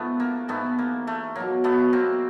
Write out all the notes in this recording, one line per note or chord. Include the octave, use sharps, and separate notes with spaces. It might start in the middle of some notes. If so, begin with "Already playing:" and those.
Already playing: G#2 F3 A3 B3
A#3
G#2 E3 A3 B3
A#3
A3
B2 F#3 A#3
A3 B3
A#3 C4